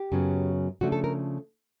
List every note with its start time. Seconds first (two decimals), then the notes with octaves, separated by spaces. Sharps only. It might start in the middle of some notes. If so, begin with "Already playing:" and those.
Already playing: G4
0.12 F#2 C#3 F#3 B3
0.81 C#3 F3 A3 D4 F#4
0.92 A4
1.04 A#4